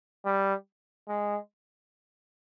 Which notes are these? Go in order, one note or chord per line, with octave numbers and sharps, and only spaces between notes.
G3
G#3